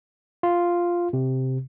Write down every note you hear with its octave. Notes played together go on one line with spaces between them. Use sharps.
F4
C3